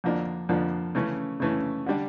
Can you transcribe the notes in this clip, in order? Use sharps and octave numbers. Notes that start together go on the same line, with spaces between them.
F2 D3 F3 A#3 D4
F2 D3 F3 A#3 D4
C#3 E3 A3 C#4
C#3 E3 A3 C#4
D3 G3 D4